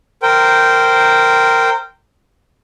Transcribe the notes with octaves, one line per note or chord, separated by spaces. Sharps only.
A#4 C5 G5